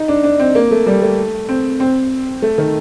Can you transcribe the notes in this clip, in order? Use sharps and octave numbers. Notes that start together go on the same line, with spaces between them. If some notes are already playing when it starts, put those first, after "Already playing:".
Already playing: D#4
D4
D4
C4
A#3
A3
G3
A3
C4
C4
A3
D#3